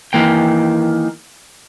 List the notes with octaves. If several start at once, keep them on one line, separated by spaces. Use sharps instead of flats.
D#3 E3 A#3 G5